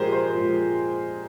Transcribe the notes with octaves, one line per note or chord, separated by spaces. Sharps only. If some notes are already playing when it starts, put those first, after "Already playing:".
Already playing: A#2 F3 G#3 G4 G#4 A#4 C5
C5
A#2 F3 G#3